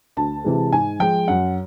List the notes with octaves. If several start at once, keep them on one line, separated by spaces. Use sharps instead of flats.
D2 A5
C3 E3 G#3
G#2 G#5
F3 G#3 G5
F#2 F#5